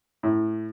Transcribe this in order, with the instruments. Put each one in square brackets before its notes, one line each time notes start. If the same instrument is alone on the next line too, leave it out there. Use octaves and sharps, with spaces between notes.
[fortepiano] A2